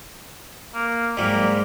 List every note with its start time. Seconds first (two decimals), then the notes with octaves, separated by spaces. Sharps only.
0.74 A#3
1.17 G#2 F#3 G3 A#3